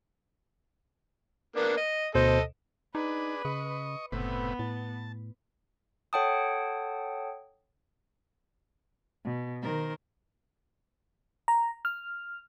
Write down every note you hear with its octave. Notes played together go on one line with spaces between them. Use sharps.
A#3 B3 D4
D#5
D2 B2 A4 C5 D#5
D4 D#4 G#4 B4
C#3 D#5 C#6
F#1 A2 C3 B3 B4
A2 A5
A4 C#5 F#5 G5 A5 D#6
B2
D#3 A#4 C5
A#5
F6